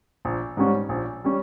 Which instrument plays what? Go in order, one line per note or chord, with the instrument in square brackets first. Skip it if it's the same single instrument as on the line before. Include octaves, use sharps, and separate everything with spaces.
[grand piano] A#1
G#2 G3 C#4
A#1
G3 C#4